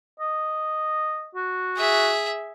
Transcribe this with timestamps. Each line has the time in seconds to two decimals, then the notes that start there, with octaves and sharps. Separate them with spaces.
0.20 D#5
1.35 F#4
1.77 G#4 E5